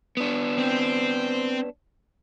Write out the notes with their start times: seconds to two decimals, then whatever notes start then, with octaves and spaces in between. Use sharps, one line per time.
0.17 B3 D4
0.58 C4